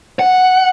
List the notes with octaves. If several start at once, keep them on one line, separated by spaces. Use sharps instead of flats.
F#5